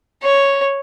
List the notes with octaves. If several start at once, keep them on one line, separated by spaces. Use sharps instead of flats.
C#5